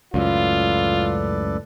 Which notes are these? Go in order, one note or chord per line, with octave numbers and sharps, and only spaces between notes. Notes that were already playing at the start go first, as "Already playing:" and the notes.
C#2 F#2 A2 F4 A4 B4 D5